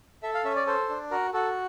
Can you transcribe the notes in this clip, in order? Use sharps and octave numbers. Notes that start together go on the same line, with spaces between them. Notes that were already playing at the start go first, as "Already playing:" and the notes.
A4 E5
F5
C#4 E5
D5
A4 C5
D4
F#4 A#4
F#4 A4